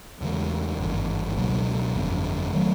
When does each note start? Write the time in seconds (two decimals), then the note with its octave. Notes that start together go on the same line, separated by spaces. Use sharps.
0.21 E2 C#3 E3 G#3
0.79 G#1 G2 E3
1.37 C#2 B2 F#3 A#3
1.94 G1 F2 D3
2.53 D#3 F#3 A3